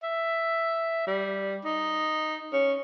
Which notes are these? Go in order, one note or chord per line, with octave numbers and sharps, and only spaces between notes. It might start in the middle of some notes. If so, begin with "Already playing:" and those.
E5
G3
D#4
C#4